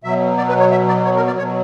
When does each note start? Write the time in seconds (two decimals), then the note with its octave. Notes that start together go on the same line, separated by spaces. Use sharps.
0.04 B2 F#3 E5
0.37 D5
0.49 B4
0.60 C#5
0.72 E5
0.88 D5
1.05 C#5
1.16 A#4
1.27 D5
1.38 B2 F#3 C#5